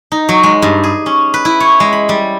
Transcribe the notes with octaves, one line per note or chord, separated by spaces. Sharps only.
D#4
F#3
G#3
G2
G#4
C#4
B4
E4
C#5
G#3
B5
G3